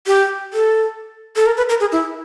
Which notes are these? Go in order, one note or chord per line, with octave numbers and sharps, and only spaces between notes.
G4
A4
A4
A#4
B4
A#4
G#4
E4